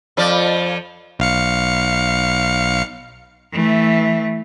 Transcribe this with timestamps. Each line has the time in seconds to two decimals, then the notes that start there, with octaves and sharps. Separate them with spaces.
0.17 F2 F3 D5
1.19 B1 F5 C#7
3.52 E3 A3